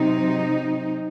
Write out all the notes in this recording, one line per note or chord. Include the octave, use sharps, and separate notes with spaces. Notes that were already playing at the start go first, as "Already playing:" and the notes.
Already playing: C3 F#3 C4 D#4